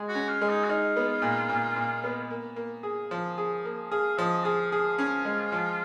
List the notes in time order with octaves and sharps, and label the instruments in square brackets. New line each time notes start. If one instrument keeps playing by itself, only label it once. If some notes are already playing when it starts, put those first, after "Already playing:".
Already playing: [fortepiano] G#3 G#4
[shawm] F#4
[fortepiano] C#4
[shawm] F4
[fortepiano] G#3
[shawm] D#4
F#4
[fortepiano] D#4 [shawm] F4
[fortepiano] B3
A#2
A#2
A#2
B3
A#3
A#3
G#4
F3
G#4
A#3
[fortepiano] G#4 [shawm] F5
[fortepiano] F3 [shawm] D#5
[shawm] F4 [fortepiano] G#4
[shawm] F4 [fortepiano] G#4
[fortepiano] C#4
G#3
F3